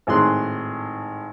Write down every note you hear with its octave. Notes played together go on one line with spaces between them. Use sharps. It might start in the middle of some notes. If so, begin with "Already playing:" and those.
G#1 A2 G#4 C6 F#6